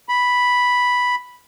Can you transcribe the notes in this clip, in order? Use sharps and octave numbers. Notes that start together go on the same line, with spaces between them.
B5